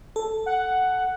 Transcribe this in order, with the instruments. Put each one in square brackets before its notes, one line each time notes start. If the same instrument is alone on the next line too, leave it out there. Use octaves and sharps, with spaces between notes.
[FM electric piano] A4
[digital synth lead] F#5